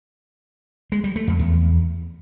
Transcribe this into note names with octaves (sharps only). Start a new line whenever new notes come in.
G#3
G3
A3
F2
E2